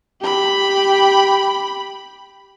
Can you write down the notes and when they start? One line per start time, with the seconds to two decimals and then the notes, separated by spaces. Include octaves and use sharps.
0.21 G4 B5